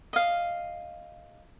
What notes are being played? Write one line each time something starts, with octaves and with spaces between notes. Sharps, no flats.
D#5 F5